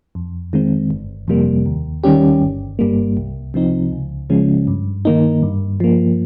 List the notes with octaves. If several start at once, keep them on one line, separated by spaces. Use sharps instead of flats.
F2
D#3 G#3 C4
G1
F2 C3 G3 A#3
D#2
D#3 G3 C#4 G4
G1
G2 G3 A#3
C2
C3 F3 C4 D#4
C#2
C#3 F3 G#3 C#4
G2
D#3 A#3 D#4
G2
F3 A#3